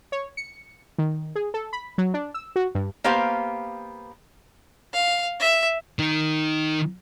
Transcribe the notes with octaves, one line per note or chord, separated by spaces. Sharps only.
C#5
C#7
D#3
G#4
A4
B5
F#3
D4
E6
F#4
G2
A#3 B3 G4 C5 F5
F5
E5
D#3 D#4